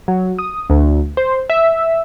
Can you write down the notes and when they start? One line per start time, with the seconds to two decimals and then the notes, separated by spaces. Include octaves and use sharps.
0.08 F#3
0.39 D#6
0.70 D2
1.17 C5
1.50 E5